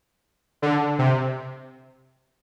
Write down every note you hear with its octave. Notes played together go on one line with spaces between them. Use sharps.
D3
C3